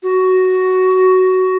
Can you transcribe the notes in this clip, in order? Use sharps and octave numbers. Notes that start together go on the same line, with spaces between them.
F#4